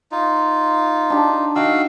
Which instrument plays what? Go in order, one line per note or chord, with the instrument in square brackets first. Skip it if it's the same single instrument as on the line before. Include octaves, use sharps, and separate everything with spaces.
[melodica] D#4 F4
[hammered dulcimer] D4 G4
[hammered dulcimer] D#3 G5 [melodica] F#4 F5 E6